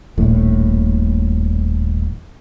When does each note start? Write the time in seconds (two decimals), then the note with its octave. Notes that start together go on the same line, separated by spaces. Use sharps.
0.18 D#1 A#1 A2